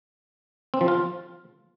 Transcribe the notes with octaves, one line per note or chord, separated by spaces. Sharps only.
C4
F3
F4